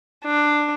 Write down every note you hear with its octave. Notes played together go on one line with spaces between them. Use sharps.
D4